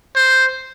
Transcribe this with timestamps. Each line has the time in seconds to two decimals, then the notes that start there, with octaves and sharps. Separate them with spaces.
0.16 C5